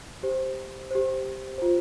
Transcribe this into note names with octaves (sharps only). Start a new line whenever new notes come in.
G4 C5
G4 C5
F4 C5